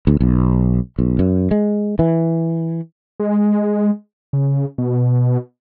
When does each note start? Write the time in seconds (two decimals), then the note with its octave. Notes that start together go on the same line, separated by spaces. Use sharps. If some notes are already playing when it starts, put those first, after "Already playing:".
0.07 D2
0.20 B1
0.99 B1
1.19 F#2
1.51 G#3
1.99 E3
3.20 G#3
4.33 C#3
4.78 B2